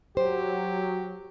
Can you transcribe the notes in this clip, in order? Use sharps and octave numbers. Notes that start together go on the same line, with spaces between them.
F#3 G4 C5